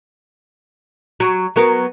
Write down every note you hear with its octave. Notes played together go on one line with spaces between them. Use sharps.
F#3
F#3 B3 A#4